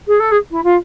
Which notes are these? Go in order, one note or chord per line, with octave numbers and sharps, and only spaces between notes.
G#4
A4
G#4
E4
F4